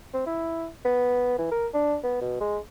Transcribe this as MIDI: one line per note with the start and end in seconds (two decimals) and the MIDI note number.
0.13 0.21 60
0.26 0.67 64
0.85 1.35 59
1.38 1.50 52
1.51 1.67 70
1.74 1.96 62
2.03 2.17 59
2.21 2.37 47
2.40 2.58 56